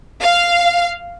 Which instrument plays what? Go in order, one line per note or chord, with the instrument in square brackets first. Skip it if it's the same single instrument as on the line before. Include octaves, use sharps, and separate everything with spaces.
[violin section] F5